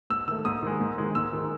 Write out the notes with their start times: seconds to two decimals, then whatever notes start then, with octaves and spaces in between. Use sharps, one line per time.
0.10 G#2 E6
0.28 D#3 A3 E6
0.45 G#2 D#6
0.63 D#3 G#3
0.80 G#2
0.98 D#3 G#3
1.15 G#2 E6
1.33 D#3 G#3